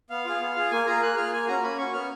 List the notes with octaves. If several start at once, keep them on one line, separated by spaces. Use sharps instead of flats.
B3 F5
F4 G#4
B3
F4 G#4
A#3 G#5
F4 G#4 A#5
A#3 F#6
F4 G#4 F6
A#3 G#5
C#4 F#4 A#5
A#3 B5
C#4 F#4 C#6
B3 F6